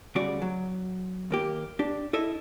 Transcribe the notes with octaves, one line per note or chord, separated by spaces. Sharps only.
D2 C#3 G3 F#4 D5
F#3
D#2 A#3 G4
D4 G4
E4 A4 D#5 E5